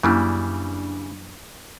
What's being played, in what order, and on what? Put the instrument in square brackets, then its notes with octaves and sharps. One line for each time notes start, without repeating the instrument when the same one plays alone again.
[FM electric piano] F#2 D4 [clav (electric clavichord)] C#3 E3 G3 [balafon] A#3 C#4 E4